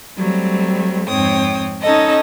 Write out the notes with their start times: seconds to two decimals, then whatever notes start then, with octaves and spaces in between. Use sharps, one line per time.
0.17 F#3 G3 A3 C4
1.07 F2 G#2 C4 C#5 G5 D#6
1.83 C#4 D#4 A4 D#5